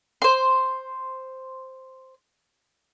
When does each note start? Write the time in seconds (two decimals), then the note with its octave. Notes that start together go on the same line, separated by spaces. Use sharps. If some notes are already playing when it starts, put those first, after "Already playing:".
0.22 C5 C6